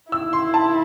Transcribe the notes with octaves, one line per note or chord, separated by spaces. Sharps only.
E4 E6
C6
A5